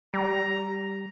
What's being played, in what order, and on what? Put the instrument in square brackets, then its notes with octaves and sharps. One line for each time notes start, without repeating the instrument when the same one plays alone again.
[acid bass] G3 [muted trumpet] A#5